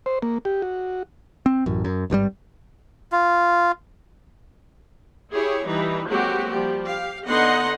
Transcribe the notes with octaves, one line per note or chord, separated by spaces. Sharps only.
C5
A#3
G4
F#4
C4
A1 F#2
F#2
G#1 G2 D3 G3
F4
E4 G4 G#4 C#5
E3 G3 D#4 B4
F#3 G#3 A#3 C4 F#4 G4
F3 G3 G4
G4 F5
D3 B3 D#4 D#5 F#5 C6